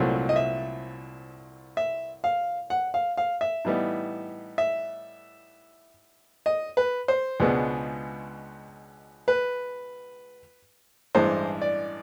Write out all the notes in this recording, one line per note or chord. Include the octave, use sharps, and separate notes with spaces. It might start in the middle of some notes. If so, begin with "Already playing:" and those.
Already playing: C2 A#2 F#3 A3 C4
D#5
E5
E5
F5
F#5
F5
F5
E5
A2 E3 G3 B3 D#4
E5
D#5
B4
C5
C#2 B2 G#3 B3 D4
B4
A1 G2 E3 G#3 C5
D5